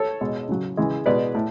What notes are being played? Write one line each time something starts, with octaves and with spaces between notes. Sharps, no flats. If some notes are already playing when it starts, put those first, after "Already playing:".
Already playing: A4 C#5
B2 G#3
C#3 F#3
C#3 E3 G#3
B2 G#3 B4 D5
A2